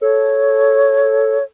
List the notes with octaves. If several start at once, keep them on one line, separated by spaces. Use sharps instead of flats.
A4 C#5